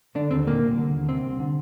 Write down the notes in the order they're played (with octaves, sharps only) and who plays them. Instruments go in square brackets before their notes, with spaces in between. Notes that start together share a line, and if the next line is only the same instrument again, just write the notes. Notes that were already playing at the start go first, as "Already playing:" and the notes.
[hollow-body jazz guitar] D3 D4
D#2 C4
A#2 A#3
C2
D3
D#2
C3 C4
C2
D3